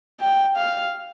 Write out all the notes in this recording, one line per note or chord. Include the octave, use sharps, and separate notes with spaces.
G5
F5